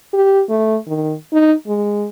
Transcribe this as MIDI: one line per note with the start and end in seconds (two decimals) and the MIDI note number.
0.13 0.41 67
0.49 0.78 57
0.87 1.15 51
1.33 1.54 63
1.67 2.06 56